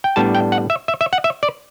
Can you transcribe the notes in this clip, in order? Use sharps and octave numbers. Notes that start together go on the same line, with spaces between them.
G5
A2 G3 B3 D4 A5
G5
F#5
E5
E5
E5
F#5
E5
D5